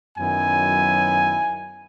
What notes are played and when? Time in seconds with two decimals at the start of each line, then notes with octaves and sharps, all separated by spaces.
0.15 F#2 D#3 F#3 B3 E4 G#5